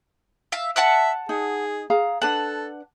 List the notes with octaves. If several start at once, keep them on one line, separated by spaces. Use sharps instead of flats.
E5 F5
E5 F#5 A5 F#6
D#4 G#4
G#4 F5 A#5
D4 A4 B4 F#5 A5